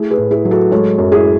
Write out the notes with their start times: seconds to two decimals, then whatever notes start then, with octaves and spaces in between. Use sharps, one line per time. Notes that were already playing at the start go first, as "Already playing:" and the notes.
Already playing: A3 E4 G#4
0.11 G#4 B4
0.18 A2
0.31 E4 G#4
0.45 F#3
0.51 F#4 A4
0.71 G#3 A4 C#5
0.98 F#2
1.12 E4 G#4